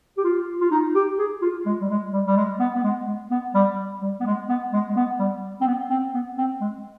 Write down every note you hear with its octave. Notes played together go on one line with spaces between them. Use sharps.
G4
F4
F4
D#4
G4
G#4
F4
G#3
G3
G#3
G3
G3
G#3
B3
B3
G#3
G#3
B3
G3
G3
B3
G#3
B3
G#3
G#3
B3
G3
C4
B3
C4
B3
C4
G#3